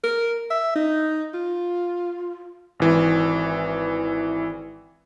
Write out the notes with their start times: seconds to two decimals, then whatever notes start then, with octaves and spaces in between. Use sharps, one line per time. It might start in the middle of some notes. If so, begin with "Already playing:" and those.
0.04 A#4
0.50 E5
0.75 D#4
1.34 F4
2.80 G#1 E3